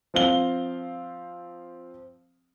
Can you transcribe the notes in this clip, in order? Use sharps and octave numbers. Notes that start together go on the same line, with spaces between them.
F3 C4 F5 G7